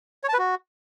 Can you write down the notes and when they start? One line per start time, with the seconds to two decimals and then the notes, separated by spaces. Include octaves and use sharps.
0.24 C#5
0.29 A5
0.34 B4
0.39 F#4